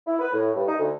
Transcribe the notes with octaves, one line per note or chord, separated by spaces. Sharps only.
E4
B4
A2
G2
D#4
D2